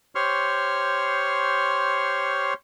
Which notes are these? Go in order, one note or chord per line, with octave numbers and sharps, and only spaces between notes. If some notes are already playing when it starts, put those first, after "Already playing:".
G4 C5 C#5 C6 C#6 F6